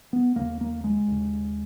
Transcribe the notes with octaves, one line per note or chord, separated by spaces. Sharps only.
B3
D#2 C#3 A#3
A#3
G#3
D#2 C#3